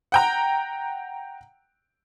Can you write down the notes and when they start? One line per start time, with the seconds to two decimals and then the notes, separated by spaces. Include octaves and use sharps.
0.12 F#5 G5 A#5